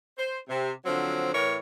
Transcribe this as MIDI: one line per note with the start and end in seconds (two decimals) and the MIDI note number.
0.18 0.37 72
0.49 0.71 48
0.85 1.30 50
0.85 1.30 53
0.85 1.30 54
0.85 1.30 60
1.33 1.57 45
1.33 1.57 52
1.33 1.57 70
1.33 1.57 73